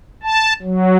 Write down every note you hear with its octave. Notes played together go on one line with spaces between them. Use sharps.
A5
F#3